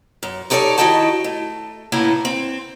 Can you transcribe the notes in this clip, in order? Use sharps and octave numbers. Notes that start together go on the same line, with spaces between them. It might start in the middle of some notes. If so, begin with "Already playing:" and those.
F#2
D#4 G4 A4 A#4 C#5 D5
D#3 E4 F#4 D#5 G5 A5
A3
A2 C#3 A#3 B3 E4
C4